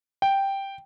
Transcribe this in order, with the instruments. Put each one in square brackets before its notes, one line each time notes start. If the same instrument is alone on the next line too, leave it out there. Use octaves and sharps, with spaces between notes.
[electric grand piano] G5